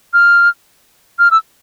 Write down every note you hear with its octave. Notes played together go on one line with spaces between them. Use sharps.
F6
F6
E6